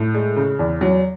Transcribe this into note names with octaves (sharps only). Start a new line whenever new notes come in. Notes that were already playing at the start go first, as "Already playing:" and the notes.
Already playing: A2
G#3
C#3
E2
F#3